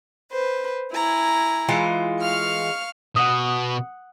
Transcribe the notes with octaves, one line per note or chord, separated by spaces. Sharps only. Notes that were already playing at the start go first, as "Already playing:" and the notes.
B4 C5
E4 G#5 A#5
E3 G#3 F4
F5 C#6 F6
B2 F#5 D#6